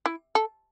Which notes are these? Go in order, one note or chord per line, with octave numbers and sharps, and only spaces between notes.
E4
A4